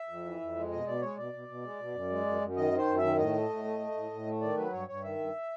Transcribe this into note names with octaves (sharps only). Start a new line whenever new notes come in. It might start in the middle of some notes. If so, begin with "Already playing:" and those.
Already playing: E5
F2
E3
F2
G#3
B2 D#5
B2 D5
G#3 C#5
B2 D5
B2
B2
G#3
B2
F#2
G#3
F#2
F#2
D#3 D#5
D#3
C5
F#2
D#3 E5
A2 D#5
A3
A2
A3
A3
A2
A2
A3
D#3 D5
F#3 B4
G2 C#5
G2 C#5
D#3 E5
G2